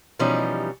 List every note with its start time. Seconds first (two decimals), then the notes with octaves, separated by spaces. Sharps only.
0.19 B2 E3 F3 G3 C#4 D#4